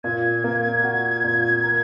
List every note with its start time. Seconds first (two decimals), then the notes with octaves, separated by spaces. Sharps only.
0.04 A#2 G#6
0.44 A#3
0.84 F#4
1.24 A#2
1.63 A#4